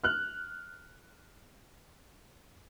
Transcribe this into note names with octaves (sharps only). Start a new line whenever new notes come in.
F6 F#6